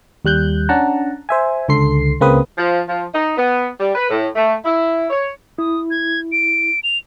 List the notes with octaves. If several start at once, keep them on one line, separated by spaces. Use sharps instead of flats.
D#2 G3 F#6 G6
C#4 D4 F#5 A5 A#5
C5 E5 G#5
C#2 D3 A4 C6 C7
C#2 C#3 A#3 C4 B4 D#6
F3
F3
D#4
B3
G3
B4
A2
A3
E4
C#5
E4 D#6
G#6
D7
F7